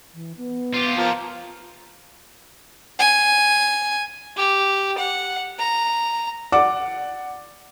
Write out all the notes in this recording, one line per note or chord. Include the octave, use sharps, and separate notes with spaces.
E3
B3
F4 G4
F3 A#3 B3
G#5
G4
F#5
A#5
D5 F#5 D6